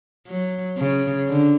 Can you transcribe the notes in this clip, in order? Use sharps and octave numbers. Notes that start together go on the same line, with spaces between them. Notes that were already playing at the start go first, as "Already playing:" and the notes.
F#3
C#3
D3